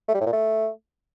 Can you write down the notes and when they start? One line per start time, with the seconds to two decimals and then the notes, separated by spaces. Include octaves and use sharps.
0.08 A3
0.14 G3
0.20 A2
0.26 A#2
0.33 A3